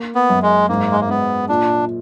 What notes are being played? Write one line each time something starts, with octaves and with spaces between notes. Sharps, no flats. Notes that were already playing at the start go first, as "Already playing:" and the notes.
Already playing: A#3
B3
F#2
G#3
G#2 A#3
G#3
A#3
G#2 B3
A#2 D4